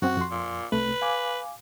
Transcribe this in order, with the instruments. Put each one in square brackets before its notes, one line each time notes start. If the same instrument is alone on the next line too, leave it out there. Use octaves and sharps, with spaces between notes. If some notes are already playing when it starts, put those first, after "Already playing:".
[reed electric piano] F#2 C4 F#5 [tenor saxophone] F#4
[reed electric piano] F2 C6
[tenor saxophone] A#2
[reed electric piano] C2 C3 A3 [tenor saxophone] B4
[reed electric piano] F5 G#5 D6